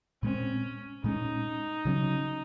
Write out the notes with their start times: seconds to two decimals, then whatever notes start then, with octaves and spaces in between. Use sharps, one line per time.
0.23 A#2 G#3 C4 C#4
1.04 A#2 G#3 C#4 D#4
1.85 C#3 F#3 C#4